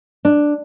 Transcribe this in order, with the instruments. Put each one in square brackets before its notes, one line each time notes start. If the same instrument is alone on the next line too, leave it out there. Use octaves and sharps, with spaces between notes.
[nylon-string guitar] D4